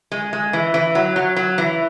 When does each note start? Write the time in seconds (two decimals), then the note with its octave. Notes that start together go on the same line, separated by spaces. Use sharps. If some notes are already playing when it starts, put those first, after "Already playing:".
0.12 G#3
0.33 G#3
0.53 E3
0.74 E3
0.95 F#3
1.16 F#3
1.36 F#3
1.58 E3